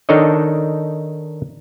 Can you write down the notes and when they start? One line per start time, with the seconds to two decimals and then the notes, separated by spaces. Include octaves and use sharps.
0.09 D#3 D4 D#4 A4 C#5 D#5